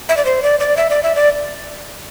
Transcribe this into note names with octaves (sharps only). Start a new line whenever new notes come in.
E5
D5
C5
D5
D5
E5
D5
E5
D5